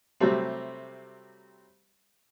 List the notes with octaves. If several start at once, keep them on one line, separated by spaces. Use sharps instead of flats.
C3 F#3 G3 A3 C4